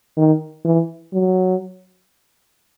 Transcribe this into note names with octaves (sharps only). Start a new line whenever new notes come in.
D#3
E3
F#3